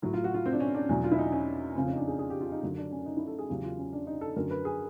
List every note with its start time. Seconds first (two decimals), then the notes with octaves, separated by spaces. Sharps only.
0.02 A2 F#3
0.13 F4
0.24 F#4
0.34 F4
0.46 C4
0.52 D4
0.60 C#4
0.75 D4
0.89 E2 B2 F#3
1.04 F4
1.12 E4
1.18 D#4
1.25 D4
1.32 C#4
1.76 F2 C#3 F3 C4
1.87 C#4
1.93 D#4
1.97 D4
2.08 G#4
2.19 G#4
2.30 G4
2.41 F4
2.52 D#4
2.62 F#2 D3 F#3
2.77 D4
2.91 C#4
3.06 D#4
3.17 E4
3.27 A4
3.39 G#4
3.49 E2 C#3 F#3 G4
3.63 F4
3.78 C#4
3.93 D4
4.07 D#4
4.21 A4
4.36 F#2 D3 F#3 A#4
4.51 B4
4.65 G#4